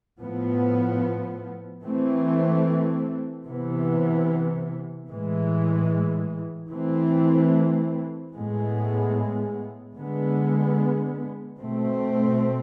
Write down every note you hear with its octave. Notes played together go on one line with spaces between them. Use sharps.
A2 F3 B3
E3 A3 C4
C3 E3 B3
A2 E3 G#3
E3 A3 C4
A2 G#3 B3
D3 G#3 B3
B2 A3 C4